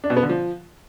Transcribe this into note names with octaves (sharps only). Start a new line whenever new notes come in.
D4
B2
B3
D3
F3